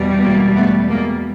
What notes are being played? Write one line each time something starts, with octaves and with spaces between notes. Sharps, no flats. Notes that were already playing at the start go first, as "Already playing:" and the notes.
Already playing: E2 B2 G3
G#3 A#3
A3 B3
G#3 A#3